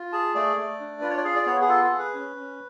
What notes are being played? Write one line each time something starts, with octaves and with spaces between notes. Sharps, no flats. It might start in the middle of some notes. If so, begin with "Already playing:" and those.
Already playing: F4
G#4 A5
A3 D5
A3
D4
F4 B4
C#5
D5
G#4 F5
D5
B3 C#5
G#4
F4 A4
A4
G#4
B4
C#4
C#4